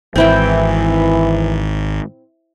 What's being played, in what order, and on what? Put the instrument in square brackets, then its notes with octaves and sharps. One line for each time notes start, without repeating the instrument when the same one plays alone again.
[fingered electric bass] G#1 [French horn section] E3 [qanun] C4 E4 G5